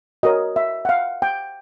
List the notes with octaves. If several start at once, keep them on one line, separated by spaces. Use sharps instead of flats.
F#4 A#4 C#5 D#5
E5
F#5
F5
G5